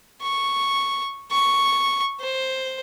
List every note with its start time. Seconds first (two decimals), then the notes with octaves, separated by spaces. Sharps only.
0.22 C#6
1.31 C#6
2.20 C5